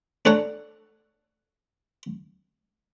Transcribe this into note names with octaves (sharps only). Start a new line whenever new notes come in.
D4 A4 C#5 F#5 A#5